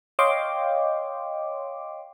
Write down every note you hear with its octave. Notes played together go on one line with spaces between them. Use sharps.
C#5 D#5 F5 G5 C6 D6